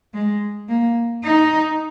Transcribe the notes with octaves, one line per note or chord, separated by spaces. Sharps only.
G#3
A#3
D#4